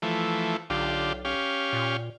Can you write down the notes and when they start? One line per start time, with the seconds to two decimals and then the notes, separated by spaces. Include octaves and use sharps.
0.02 E3 F3 A3
0.70 B1 D3 F4 G4
1.25 C#4 G4 F5
1.73 A#2